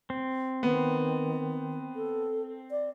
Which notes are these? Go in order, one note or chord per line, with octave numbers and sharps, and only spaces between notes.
C4
D#3 B3
A4
D5